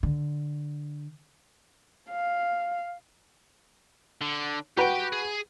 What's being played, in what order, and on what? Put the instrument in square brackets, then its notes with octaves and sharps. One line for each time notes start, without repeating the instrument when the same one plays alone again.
[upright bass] D3
[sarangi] F5
[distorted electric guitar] D3
[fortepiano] F#4 B4 [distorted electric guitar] G4 G5
[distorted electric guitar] G#4